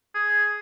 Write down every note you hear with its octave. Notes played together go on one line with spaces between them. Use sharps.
G#4